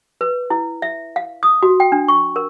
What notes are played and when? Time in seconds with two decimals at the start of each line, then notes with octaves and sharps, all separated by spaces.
0.21 B4
0.50 E4
0.82 E5
1.16 F5
1.43 D#6
1.63 F#4
1.80 G5
1.92 D4
2.08 C#6
2.36 A#4